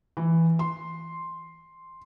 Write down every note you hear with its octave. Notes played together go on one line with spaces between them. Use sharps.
E3
C6